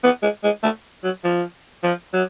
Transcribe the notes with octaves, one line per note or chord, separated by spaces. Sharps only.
B3
G#3
G#3
A3
F#3
F3
F3
F#3